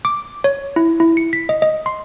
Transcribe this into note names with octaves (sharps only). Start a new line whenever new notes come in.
D6
C#5
E4
E4
C#7
B6
D#5
D#5
C6